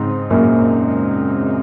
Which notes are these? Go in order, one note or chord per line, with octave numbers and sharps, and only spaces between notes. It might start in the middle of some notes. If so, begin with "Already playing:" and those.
Already playing: G#2 C#3 G#3 C4 D#4
F#2 A#2